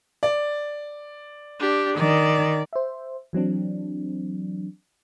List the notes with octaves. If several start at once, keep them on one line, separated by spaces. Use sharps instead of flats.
D5
D4 G4
D#3 D5
C5 E5
E3 F#3 C4 D4